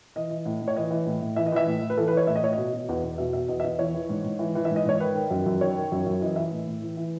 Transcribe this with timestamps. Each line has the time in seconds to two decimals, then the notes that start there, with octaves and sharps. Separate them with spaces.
0.16 E3 D#5
0.30 E3
0.46 A2
0.62 A2
0.68 C#5
0.76 E3 D#5
0.91 E3
1.06 A2
1.22 A2
1.36 E3 E5
1.46 D#5
1.52 E3 E5
1.67 A2
1.82 A2
1.90 B4
1.97 E3 A4
2.08 B4
2.12 E3 C#5
2.27 A2 E5
2.36 D#5
2.43 A2 C#5
2.53 B2 D#5
2.73 B2
2.89 E2
3.04 E2
3.18 B2 E5
3.33 B2 E5
3.48 E2 D#5
3.60 E5
3.64 E2 D#5
3.79 E3 C#5
3.94 E3
4.09 G#2
4.24 G#2
4.39 E3
4.55 E3
4.65 E5
4.71 G#2
4.76 D#5
4.85 G#2 C#5
5.00 D#3 B4
5.15 D#3
5.31 F#2
5.46 F#2
5.60 D#3 C#5
5.76 D#3
5.92 F#2
6.06 F#2
6.21 E3 D#5
6.36 E3 E5
6.52 A2
6.66 A2
6.82 E3
6.97 E3